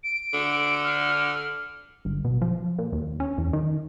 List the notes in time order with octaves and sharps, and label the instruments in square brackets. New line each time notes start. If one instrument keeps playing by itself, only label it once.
[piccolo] D7
[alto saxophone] D3
[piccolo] F6
[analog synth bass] G1
B2
F3
A#2
D#2
C#4
E2
D#3